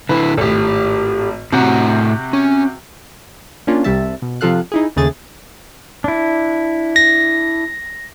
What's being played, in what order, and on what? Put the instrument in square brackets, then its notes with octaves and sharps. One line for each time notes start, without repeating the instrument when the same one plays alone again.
[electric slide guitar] D3 E4 [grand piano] B4
[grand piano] G#1 A2 [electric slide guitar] G4 A4
[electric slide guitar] A2 F#5 A#5 [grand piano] C3 F#4
[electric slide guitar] C#4
[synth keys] A#3 C#4 D4 F4
C2 C3 G3 E5 A5
B2
C3 F3 F4 A4 F5 F#6
D#4 E4 G#4
D#2 C#3 A3 G#4 A6
[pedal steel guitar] D4 E4
[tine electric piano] A#6